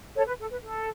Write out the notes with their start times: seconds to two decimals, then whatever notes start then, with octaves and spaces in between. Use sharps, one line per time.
0.16 A4 C#5
0.27 B4
0.40 A4
0.50 B4
0.62 A4